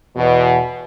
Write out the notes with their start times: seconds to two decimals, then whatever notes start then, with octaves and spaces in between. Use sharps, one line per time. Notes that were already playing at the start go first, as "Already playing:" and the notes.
0.16 E2 B2